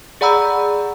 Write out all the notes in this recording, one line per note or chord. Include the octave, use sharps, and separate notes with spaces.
G#4 D5 F#5 A#5 B5 E6